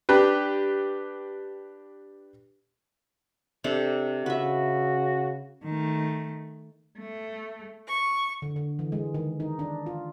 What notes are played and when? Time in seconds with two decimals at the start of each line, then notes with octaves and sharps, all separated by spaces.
0.09 D4 G4 B4
3.64 C3 D4 A4
4.26 C#3 F#4 B4 E5
5.64 D#3 A3
6.99 A3
7.88 C#6
8.42 D3
8.56 D3
8.79 E3
8.92 G#3
9.14 D#3
9.40 D#4
9.59 D4
9.86 F4